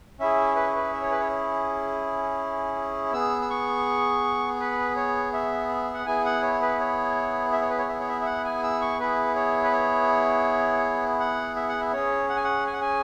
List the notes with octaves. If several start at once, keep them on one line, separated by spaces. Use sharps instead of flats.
C#4 E4 G#4 E5
B4
B4
E5
C#5
B4
C#5
B3 G#4 E6
E6
C#6
B4
C#5
E5
F#5
B3 E4 G#4 G#5
F#5
C#5
B4
C#5
E5
C#5
B4
C#5
E5
C#5
E5
E5
F#5
G#5
E6
C#6
B3 E4 G#4 B4
C#5
B4
C#5
F#5
E5
F#5
E5
C#4 G#4 C#5
F#5
G#5
F#5
G#5
F#5
G#5